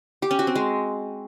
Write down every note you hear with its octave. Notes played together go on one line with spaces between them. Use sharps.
G4
C#4
F#4
C4
G#3